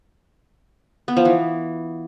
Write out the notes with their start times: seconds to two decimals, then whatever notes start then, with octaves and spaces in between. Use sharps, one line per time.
1.08 B3
1.17 F3
1.25 E3